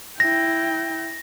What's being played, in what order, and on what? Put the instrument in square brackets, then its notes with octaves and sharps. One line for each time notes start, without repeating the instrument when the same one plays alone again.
[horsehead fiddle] E4 G5 [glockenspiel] A#6